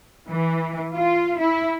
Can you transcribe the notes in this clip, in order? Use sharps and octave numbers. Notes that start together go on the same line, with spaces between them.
E3
F4
E4